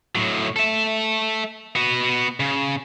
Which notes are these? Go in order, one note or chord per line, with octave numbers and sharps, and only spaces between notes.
A2 F#3
A4 E5
B3 F#4
C#3